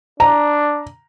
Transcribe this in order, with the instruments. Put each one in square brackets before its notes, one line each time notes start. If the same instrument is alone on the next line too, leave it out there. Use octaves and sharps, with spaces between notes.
[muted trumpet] D4 [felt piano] A#5